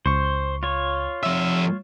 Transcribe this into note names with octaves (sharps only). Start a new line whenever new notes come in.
C#2 C5 C#6
F4 C#5
F2 E5 E6